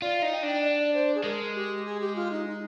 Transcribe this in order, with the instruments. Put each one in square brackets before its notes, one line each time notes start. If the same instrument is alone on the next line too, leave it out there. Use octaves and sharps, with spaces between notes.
[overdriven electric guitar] F4 [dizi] D5
[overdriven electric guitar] D#4 [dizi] F5
[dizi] G5
[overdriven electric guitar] D4 [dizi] G5
[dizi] D#5
D5
C5
G#4
[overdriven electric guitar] G#3 [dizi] A#4
[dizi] G4
G#4
G4
F4
D#4
D#4